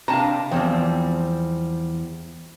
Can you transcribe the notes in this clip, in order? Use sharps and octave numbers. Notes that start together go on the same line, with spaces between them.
C3 D4 F5 A5 A#5
E2 F3 G3 C4